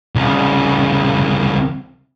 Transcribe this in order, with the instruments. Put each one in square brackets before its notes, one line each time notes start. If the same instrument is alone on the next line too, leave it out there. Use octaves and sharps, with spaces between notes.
[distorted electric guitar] C2 C#3